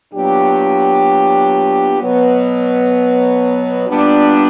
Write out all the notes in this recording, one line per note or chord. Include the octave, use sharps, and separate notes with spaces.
A#2 F#3 B3 D4 G4
B2 F#3 B3
A#2 G3 B3 D4